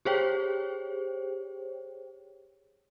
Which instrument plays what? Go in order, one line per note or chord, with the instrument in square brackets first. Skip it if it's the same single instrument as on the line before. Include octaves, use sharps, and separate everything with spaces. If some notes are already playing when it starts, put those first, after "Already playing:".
[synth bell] G4 G#4 C5 C#5 G5